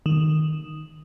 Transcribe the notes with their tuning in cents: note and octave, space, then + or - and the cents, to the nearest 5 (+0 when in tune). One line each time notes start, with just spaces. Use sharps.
D#3 -5